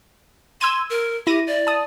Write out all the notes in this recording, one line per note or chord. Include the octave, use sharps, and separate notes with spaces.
C6 E6 G#6 D#7
A#4
E4 G4 A#6 D#7
D5
A5 D#6